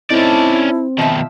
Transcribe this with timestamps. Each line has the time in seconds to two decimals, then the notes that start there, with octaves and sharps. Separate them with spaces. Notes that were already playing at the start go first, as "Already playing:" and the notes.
0.10 C4 C#4 D#4 E4 A4 D5
0.99 B2 D#3 F3 E5